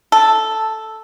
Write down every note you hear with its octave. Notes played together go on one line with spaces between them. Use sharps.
A4